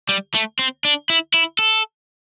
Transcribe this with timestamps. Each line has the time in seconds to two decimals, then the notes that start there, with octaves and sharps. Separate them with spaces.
0.09 G3
0.34 A3
0.59 C4
0.85 D4
1.10 E4
1.34 E4
1.59 A4